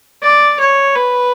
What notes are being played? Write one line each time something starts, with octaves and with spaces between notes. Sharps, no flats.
D5
C#5
B4